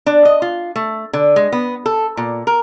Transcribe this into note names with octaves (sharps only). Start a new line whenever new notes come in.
D4
D#5
F4
A3
D3
G#3
B3
A4
A#2
A#4